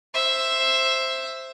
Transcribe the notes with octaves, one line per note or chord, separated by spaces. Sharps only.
C5 E5